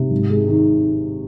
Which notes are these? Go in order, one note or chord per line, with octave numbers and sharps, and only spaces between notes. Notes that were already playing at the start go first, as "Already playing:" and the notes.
Already playing: C3
G#1
G#3
D#3